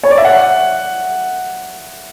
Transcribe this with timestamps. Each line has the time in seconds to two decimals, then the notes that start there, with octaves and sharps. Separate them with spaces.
0.03 C#5
0.11 D5
0.18 E5
0.25 F#5